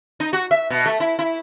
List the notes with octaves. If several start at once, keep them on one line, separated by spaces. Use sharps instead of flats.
D#4
F#4
E5
B2
A3
E4
E4